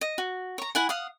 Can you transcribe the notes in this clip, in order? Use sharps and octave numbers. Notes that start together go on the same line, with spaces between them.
D#5
F#4
C#5 A#5
E4 F#5 G#5
F5 F#5 D#6